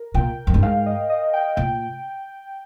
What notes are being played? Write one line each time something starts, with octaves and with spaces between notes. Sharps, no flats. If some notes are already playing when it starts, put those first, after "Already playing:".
Already playing: A#4
A#2 G5
F2
G2
G#2 F5
D#5
D#5
G5
A#2 G5